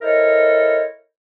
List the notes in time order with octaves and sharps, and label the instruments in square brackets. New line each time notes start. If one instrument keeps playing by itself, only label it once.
[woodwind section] E4 A4 A#4 C5 C#5 D#5